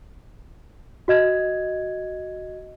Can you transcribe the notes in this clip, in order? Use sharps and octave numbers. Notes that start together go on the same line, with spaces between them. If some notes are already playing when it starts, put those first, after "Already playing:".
F#4 D#5 G#6